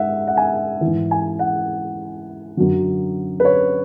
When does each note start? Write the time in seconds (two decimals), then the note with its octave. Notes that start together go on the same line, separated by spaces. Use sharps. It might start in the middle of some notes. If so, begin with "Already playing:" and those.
Already playing: G#2 E5 F#5
0.27 F#5
0.37 G#5
0.81 G#2 E3
1.11 G#5
1.39 F#5
2.57 F#2 D3 F#3
3.40 B4
3.45 C#5